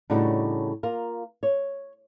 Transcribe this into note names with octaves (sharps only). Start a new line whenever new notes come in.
A2 C#3 G3 D4 D#4 F#4
A#3 F4 A#4
C#5